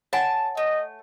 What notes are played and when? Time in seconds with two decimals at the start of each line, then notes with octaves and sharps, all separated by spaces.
0.13 C#5 F#5 G#5 A5
0.57 A3 D#5